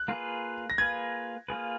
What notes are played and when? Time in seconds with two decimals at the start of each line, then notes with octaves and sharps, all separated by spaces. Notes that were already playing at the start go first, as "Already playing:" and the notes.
Already playing: F#6
0.08 A#3 F4 G#4 B4
0.70 A#6
0.78 A#3 F4 G#4 B4 G#6
1.48 A#3 F4 G#4 B4